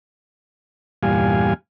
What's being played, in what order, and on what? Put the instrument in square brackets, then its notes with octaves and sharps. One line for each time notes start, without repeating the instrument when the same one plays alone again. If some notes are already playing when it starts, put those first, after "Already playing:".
[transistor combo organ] E2 G2 A#2 G3 F5 G#5